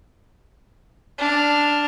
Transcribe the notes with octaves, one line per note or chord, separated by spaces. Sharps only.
D4 F6